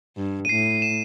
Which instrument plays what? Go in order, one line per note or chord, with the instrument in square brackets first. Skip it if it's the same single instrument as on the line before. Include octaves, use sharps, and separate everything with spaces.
[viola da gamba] G2
[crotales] D#7
[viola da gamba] A2 [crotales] C7
[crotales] E7